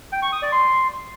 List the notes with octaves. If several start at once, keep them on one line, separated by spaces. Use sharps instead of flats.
G5
C#6
D#6
D5
C6